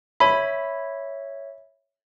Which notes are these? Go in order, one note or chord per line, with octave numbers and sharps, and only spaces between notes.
C#5 E5 B5